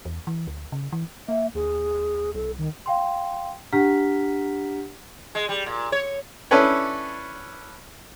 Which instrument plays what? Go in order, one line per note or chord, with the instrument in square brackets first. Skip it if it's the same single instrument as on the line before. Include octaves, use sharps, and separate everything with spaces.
[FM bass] E2
E3
D2
C#3
E3
[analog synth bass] A#3 [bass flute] E5
[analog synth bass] D#2 [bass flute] G#4
[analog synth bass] C2 [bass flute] A4
[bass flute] D#3
[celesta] F5 G5 C6
D4 G4 F#5 A#5 F6 B6
[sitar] G#3
G3
A#2
C#5
[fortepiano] C#4 D4 E4 A4 B4 C#5